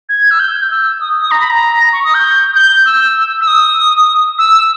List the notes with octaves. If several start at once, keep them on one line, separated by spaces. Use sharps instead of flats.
G#6
E6
G6
E6
D#6
D#6
A#5
B5
A#5
C#6
D#6
G6
G6
E6
E6
D#6
E6